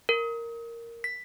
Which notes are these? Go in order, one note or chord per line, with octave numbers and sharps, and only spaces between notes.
A#4
B6